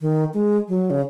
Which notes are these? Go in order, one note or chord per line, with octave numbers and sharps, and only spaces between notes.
D#3
G#3
F#3
C#3